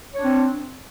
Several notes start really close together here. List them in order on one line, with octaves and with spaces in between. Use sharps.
C#5 D4 C4